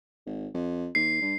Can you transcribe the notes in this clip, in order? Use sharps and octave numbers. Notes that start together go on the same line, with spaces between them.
G#1
F2
D#2 C7
G2